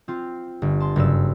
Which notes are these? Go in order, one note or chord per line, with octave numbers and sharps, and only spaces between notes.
C4 F4
G1
A5 C6
F#1 G2 E6 E7